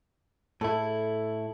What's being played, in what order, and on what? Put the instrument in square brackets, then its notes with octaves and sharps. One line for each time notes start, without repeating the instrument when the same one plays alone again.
[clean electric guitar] A2 E4 [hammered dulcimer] A4